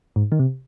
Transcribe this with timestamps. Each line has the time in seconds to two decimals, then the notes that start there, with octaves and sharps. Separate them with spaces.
0.16 G#2
0.32 D#3
0.39 C3